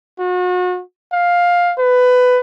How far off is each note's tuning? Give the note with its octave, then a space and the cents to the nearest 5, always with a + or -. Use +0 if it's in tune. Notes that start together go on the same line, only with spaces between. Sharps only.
F#4 -35
F5 +10
B4 +15